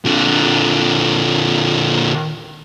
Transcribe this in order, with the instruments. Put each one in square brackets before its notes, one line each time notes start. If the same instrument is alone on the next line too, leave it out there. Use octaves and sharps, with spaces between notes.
[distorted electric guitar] A#2 D3